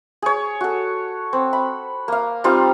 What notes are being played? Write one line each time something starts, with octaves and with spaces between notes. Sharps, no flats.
G#4 C#5
F#4 A4
C4
B5
A#3 F5
G3 C4 D#4 F4